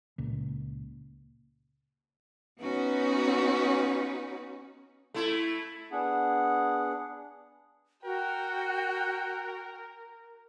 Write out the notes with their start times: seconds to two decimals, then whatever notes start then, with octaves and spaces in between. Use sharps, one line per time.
0.18 C#2 A#2
2.58 B3 C#4 D#4 F#4 B4
5.14 A3 E4
5.92 B3 D4 G#4 F#5
8.04 F#4 A#4 G5